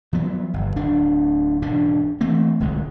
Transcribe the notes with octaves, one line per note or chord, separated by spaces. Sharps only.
F3 F#3 B3
G1
D1 D4
E1 G#2 C#3 D4
E3 A3 A#3 C4
D1 C2 D3 G#3